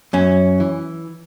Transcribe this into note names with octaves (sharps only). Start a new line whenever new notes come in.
F#2 C#4
E3